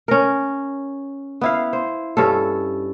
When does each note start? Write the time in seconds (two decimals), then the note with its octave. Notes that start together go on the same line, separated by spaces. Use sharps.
0.08 C#4 A#4
1.41 B3 E4 F5
1.73 C5
2.17 G2 C#4 A4